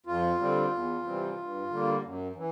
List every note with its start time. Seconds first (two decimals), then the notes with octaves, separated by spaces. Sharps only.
0.06 F2 F4
0.39 D3 G3 C4
0.71 E2
1.04 C3 E3 G3 C4
1.37 G2
1.69 D3 G3 A#3
2.02 F#2
2.36 E3